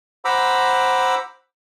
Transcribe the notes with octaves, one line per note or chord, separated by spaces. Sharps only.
C5 F#5 A#5 B5 D6 E6